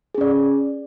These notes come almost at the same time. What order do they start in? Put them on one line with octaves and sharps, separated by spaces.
G#4 C#4 D5